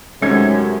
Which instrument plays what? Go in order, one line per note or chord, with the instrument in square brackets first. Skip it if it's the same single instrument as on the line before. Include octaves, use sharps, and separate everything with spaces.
[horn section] F#2 C3 [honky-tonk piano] D#3 A3 G#6 [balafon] G#3 [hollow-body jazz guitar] C#4